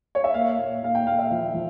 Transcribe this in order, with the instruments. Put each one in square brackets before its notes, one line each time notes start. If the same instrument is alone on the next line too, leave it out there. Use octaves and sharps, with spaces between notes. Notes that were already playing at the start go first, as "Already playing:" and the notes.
[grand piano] C#5
E5
A#3 F5
A#2
A#2 F5
G5
A#2 F5
E5
F3
F3